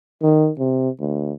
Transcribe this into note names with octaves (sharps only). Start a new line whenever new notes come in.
D#3
C3
D2